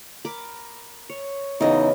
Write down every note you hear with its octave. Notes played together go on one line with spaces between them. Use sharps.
A#4 B5 D6
C#5
E2 C#3 F#3 B3 D#4 D#5